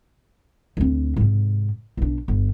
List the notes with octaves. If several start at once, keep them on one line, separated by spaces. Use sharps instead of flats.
D2 C4
G#2 C3
B1 D4
G1